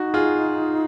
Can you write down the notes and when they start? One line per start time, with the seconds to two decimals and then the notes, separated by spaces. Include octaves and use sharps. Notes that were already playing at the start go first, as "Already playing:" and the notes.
Already playing: D#4 F#4
0.14 F4 G#4